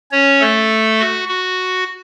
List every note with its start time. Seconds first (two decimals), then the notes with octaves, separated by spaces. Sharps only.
0.11 C#4 C#5
0.40 A3 A4
1.00 F#4
1.29 F#4